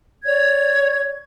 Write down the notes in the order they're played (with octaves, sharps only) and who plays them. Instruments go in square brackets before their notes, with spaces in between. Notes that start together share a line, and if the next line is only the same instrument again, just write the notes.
[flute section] C#5 D5 G#6